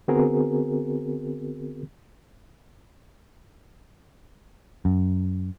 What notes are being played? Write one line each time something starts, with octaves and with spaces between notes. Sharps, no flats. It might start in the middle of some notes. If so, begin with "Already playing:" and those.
D3 B3 C4 F#4 G#4 A#4
F#2